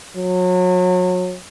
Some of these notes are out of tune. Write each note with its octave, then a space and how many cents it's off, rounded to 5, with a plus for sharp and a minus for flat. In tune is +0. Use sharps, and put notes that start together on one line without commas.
F#3 -30